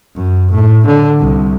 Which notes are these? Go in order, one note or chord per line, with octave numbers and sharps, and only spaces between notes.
F#2
A2
D3
C2